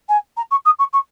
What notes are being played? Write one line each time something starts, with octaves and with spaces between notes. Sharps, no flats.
G#5
A#5
C#6
D#6
C#6
C#6